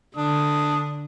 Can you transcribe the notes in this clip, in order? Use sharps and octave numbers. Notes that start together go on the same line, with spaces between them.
D3 D4 D#6